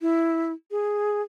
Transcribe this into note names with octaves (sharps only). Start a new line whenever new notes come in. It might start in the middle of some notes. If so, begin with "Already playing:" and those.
E4
G#4